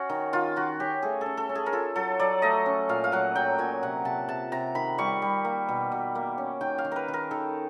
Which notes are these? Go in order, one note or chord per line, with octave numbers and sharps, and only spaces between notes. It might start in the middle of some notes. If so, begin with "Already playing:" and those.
Already playing: C#4 F#4
D#3
D#3 F4
D#3 F#4
C#4 G4
A3 G#4
C#4 A4
A4
C#4
G#4
A#4
F4 A4
F#3 A4
F#3 D5
A3 D#5
C#4
A#2 F5
F5
F#3 F#5
F#3 G5
A#2 G#5
C3 F#5
C3 A5
C3 A5
C3 A#5
D#3 B5
G3 C#6
G3
A#3
B2
B2
A#3
C#4
D#3 G5
F5
D#3
A#4 B4
D#3
A#4
D#3 A4